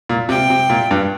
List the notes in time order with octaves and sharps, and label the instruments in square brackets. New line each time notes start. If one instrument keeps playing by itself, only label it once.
[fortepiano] A#2
[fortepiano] C3 [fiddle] G5
[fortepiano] C3
A#2
G2